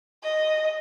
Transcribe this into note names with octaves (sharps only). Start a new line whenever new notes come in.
D#5